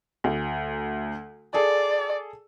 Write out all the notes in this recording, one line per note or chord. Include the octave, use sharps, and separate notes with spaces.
D2
G#4 A4 D5